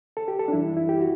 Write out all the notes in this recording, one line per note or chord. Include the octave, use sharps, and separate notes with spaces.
A4
G4
A4
D4
F#2 E3 G3 E4
E4
G4
F#4